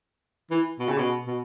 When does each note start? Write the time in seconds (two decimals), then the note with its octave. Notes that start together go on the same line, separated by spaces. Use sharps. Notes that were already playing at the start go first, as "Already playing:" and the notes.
0.51 E3
0.79 B2
0.89 C#3
0.98 B2
1.27 B2